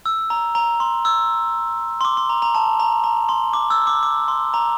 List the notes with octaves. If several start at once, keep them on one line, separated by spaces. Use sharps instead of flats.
E6
A#5
A#5
C6
E6
C6
D6
C6
A#5
A#5
A5
A#5
A#5
C6
D6
E6
D6
D6
C6
A#5